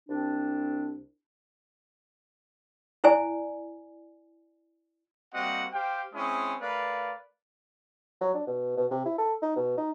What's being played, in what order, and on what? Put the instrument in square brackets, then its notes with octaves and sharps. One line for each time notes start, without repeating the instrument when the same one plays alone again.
[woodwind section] C2 C4 D4
[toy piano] E4 C5 D5 G#5
[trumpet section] G3 A#3 C4 F#4 D#5 F#5
G4 C5 F5 G5
G#3 C4 C#4 E4 D#6
A3 A#4 B4 D5 F5
[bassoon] F#3
D4
B2
B2
C3
E4
A4
D#4
B2
D#4